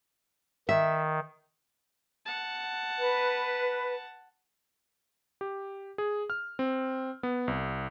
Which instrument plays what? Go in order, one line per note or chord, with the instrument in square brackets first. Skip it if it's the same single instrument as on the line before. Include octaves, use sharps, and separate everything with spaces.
[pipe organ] D#3 [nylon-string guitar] E5
[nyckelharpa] F#5 A5
[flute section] B4
[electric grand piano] G4
G#4
F6
C4
B3
C2